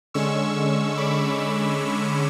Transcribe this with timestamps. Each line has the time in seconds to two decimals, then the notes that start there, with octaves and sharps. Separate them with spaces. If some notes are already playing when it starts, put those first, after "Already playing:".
0.14 D3 G#3 C#4 C#6 E6
0.97 B5 D6